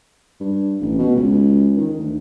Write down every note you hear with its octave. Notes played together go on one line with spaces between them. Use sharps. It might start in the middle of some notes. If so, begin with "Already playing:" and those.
G2
A1
B2
C#2
D#3
D2